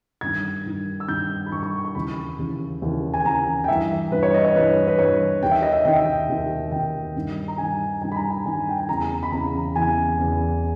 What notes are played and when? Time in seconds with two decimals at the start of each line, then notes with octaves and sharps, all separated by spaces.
0.21 G2 D#3 G#6
0.66 G2 D#3
1.00 E6
1.08 G2 D#3 G6
1.46 B5
1.52 G2 D#3 C#6
1.63 C#6
1.85 C#6
1.95 D#2 C#3 E3 B5
2.38 D#2 C#3 E3
2.82 D#2 C#3 E3
3.14 G#5
3.25 D#2 C#3 E3 A#5
3.64 G5
3.68 G2 E3 E5
4.11 G2 E3 B4
4.23 C#5
4.34 D#5
4.45 C#5
4.56 G2 E3 B4
4.88 B4
4.99 G2 E3 C#5
5.43 D#2 D#3 G5
5.51 E5
5.62 D#5
5.72 E5
5.85 D#2 D#3 G5
5.96 E5
6.05 G5
6.29 D#2 D#3
6.72 D#2 D#3 G5
7.16 G2 D#3
7.48 A#5
7.58 G2 D#3 G#5
8.02 G2 D#3 G#5
8.12 B5
8.16 A#5
8.30 G#5
8.45 G2 D#3 G#5
8.69 G5
8.78 G#5
8.89 E2 C#3 E3 A#5
9.23 B5
9.32 E2 C#3 E3 A#5
9.76 E2 C#3 E3 G#5
10.18 E2 C#3 E3